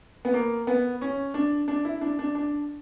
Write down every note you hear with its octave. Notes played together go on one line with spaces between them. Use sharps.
B3
A#3
B3
C#4
D4
D4
E4
D4
D4
D4